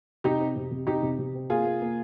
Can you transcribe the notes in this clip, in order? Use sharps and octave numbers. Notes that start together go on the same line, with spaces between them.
C3 D#4 G4
C4
C3
C3
C3 D#4 G4
C3
C3
C4
A#3 F4 G#4
A#3
A#3